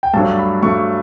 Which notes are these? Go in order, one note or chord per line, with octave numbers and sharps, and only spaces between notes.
G5
G2 F#3 A3 D4 A5
B5
G2 F#3 A3 D4 C#6